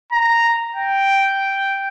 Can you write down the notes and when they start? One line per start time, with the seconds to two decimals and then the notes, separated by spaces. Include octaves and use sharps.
0.12 A#5
0.75 G5